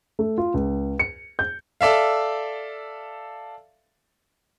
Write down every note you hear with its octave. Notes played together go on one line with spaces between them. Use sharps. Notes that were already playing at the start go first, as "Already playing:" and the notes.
A3
F4
C#2
C#7
G6
A4 D5 E5 F5